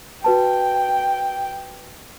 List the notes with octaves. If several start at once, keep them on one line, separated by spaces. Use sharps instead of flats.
F#4 B4 G5 A5